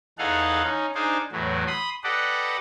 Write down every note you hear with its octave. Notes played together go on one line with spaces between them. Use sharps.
E2 D#4 G#4 A4 F5 F#5
C#4 D#4
D4 D#4 G#4 C5 F5
E2 A2 F#3
B5 C6 D#6
G4 A4 B4 D5 D#5 F#5